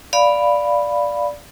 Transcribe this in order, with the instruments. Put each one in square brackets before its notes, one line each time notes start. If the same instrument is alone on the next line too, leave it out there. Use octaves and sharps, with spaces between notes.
[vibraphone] D5 F5 B5